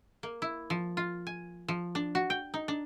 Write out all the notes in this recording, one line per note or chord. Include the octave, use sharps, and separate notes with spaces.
A#3
E4
F3
F4
G#5
F3
D4
F#4
G5
D#4
D4